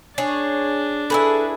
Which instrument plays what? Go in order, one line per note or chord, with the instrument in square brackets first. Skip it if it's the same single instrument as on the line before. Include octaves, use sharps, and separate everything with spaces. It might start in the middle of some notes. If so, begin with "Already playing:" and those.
[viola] D4 [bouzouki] G#4 C#5
[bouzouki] E4 G#4 B4 [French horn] A4